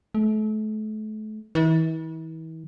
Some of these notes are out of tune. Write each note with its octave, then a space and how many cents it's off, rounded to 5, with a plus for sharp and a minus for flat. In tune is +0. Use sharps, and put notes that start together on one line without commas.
A3 -35
E3 -40